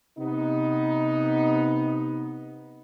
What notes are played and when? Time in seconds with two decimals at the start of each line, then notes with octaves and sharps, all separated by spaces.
0.18 C3 B3 D#4